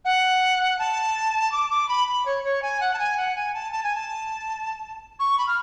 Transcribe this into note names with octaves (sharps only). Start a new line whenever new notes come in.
F#5
A5
D6
D6
B5
B5
C#5
C#5
G#5
F#5
A5
G#5
F#5
G#5
A5
A5
G#5
A5
C#6
B5
F6